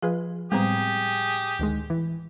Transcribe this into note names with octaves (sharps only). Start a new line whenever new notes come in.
F3 F4 G#4 B4
A2 G3 G#3 B3 C4 G4 G#4
D2 D#3 G#3
E3